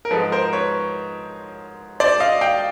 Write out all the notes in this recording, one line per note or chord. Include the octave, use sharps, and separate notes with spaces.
A#4
G#2 F3 G#3 A4 B4
A#4 C5
B4 C#5
C5 D5
D#5 F5
F5 G5